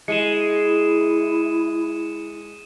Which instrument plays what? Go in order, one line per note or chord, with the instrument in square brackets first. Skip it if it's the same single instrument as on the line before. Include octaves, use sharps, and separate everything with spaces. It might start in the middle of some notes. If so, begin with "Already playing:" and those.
[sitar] G#3 [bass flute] E4 [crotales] C#7 D#7 E7